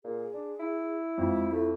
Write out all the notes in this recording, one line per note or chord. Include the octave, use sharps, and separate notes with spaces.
A#2 G#4
D4
E4
F2 F3 G#3
A3 E4